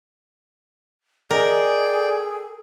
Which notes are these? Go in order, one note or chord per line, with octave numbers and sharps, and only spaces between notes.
G#4 A#4 D5 D#5 G5
A4